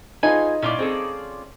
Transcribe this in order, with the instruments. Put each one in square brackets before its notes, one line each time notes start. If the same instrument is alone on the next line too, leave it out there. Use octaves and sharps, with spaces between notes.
[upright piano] D#4 [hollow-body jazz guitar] F4 G#4 B4 [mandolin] G#5
[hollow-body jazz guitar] A#2 E4 [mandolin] C#4 F4 D5
[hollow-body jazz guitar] C4 G#4 A4